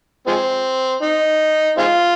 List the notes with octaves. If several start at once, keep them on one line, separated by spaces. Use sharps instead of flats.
F3 G#3 C4
D#4
G#3 C4 F4